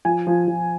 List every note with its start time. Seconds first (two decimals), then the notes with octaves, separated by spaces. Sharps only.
0.05 F3 G#5
0.27 F3
0.48 F3